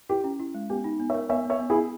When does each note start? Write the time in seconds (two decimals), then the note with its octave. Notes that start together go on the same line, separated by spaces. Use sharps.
0.09 E4 G4
0.24 C#4
0.40 E4
0.55 G#3
0.70 B3 G4
0.84 D#4
1.00 B3
1.10 C#5 E5
1.14 A#4
1.29 B3 C#5 E5
1.45 B3 C#5 E5
1.60 B3
1.70 E4 G#4
1.75 B3